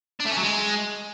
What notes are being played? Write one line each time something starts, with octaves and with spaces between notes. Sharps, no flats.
D4
A3
C#4
F#3
G#3